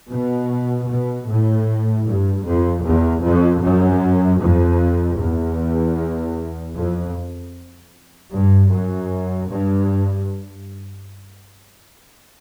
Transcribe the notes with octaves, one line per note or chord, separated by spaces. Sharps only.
B2
B2
A2
G2
F2
E2
F2
F#2
F2
E2
F2
G2
F#2
G2